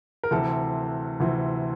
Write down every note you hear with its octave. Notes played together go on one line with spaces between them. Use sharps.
A#4
D2 C3 E3 A4
D2 C3 E3